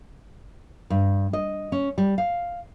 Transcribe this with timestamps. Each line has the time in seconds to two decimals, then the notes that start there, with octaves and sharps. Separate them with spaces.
0.90 G2
1.33 D#5
1.72 C#4
1.98 G3
2.18 F5